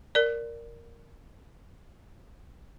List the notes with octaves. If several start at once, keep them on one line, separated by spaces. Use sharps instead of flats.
A#4 D5